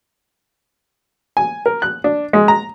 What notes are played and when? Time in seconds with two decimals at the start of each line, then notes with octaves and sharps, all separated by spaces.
1.37 G#5
1.66 A#4
1.82 F#6
2.04 D4
2.33 G#3
2.48 A#5